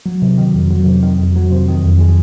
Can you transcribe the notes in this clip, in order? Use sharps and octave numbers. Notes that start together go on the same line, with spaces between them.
F#3
C3
D#3
F2
F#3
C3
D#3
F2
F#3
C3
D#3
F2
G#3